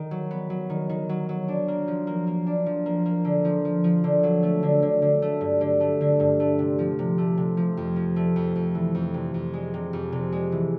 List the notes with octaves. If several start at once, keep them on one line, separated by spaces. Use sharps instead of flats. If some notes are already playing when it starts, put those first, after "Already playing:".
Already playing: D#3
F#3
B3
F#3
D#3
D#3
F#3
F#3
D4
A#3
F3
A#3
A#3
D4
F3
A#3
A#3
D3
F3
F3
F3
D3
F#3
A3
D3
D3
D3
A3
G2
D3
A3
D3
G2
A3
C3
F3
C3
A3
C3
F3
F2
F3
A3
F2
F2
E3
F2
C3
F2
G#3
C3
F2
C3
G#3
E3